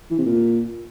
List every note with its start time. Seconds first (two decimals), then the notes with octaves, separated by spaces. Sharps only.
0.11 E3
0.18 C3
0.26 A#2